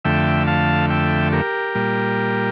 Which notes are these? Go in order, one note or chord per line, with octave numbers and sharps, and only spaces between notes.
F2 D3 A3 E5 G5
F5 A5
E5 G5
G4 A#4
A#2 G3